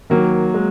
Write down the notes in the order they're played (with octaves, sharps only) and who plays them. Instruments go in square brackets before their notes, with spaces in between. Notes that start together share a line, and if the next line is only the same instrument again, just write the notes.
[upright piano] D#3 [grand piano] F#3 A#3
[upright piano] G#3